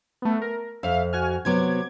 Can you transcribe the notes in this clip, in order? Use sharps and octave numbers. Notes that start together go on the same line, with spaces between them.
A3 B3
A#4
F2 E5 F5
F#4 G#5 F6
C3 F#3 B3 D6 G#6